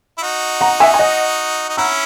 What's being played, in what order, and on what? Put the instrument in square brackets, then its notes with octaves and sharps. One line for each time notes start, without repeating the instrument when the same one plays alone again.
[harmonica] E4
D#4 F#4
[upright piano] F#5 A#5
E5 G#5
G#5
D#5 F#5
[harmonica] D#4
[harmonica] C#4 E4 [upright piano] F#5 A#5